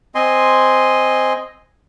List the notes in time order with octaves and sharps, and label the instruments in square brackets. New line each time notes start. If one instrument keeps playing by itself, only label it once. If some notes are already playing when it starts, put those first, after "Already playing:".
[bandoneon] C4 D#5 G#5 C6